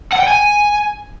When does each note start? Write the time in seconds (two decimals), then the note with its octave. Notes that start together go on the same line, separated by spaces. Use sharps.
0.13 F#5
0.20 G5
0.28 G#5